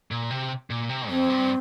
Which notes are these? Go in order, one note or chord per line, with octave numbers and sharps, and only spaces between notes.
A#2
C3
A#2
C3
F2 C4
G2